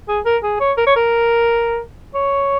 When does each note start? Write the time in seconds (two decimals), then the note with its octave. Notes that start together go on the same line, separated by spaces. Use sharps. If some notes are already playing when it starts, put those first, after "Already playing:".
0.08 G#4
0.25 A#4
0.43 G#4
0.60 C#5
0.77 A#4
0.87 C#5
0.96 A#4
2.15 C#5